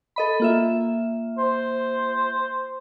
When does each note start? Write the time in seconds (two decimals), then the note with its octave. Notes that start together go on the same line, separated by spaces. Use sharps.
0.16 A4 D#5 B5
0.40 A#3 F4 E5
1.38 C5